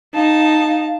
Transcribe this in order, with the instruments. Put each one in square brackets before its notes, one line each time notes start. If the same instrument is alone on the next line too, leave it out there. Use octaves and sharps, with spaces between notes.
[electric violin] D#4 [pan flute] F5 [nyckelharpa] A5